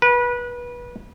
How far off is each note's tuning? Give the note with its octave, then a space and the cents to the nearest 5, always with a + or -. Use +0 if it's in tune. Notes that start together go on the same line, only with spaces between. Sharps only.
B4 -25